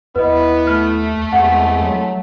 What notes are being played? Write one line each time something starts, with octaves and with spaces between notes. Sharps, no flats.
D#2 B3 E4 B4 D#5
A3 F6
E2 C3 E3 G#3 F#5
F#3